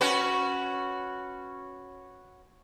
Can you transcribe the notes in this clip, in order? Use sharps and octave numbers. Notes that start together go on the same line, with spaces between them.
C#4 F#4 B4